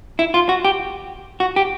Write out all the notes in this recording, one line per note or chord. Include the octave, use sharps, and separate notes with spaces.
E4
F4
F#4
G4
F#4
G4